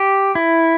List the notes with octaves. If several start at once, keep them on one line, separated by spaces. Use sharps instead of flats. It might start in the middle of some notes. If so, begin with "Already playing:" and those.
Already playing: G4
E4